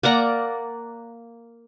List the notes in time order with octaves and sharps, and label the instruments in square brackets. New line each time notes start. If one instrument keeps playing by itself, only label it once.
[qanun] A#3 D5 F#5 A#5